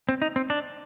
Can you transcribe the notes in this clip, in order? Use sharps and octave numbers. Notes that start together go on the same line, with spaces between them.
C4
D#4
C4
D4